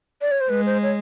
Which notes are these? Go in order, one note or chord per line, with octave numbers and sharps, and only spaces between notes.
D5
C#5
C5
G#3 B4
C5
C#5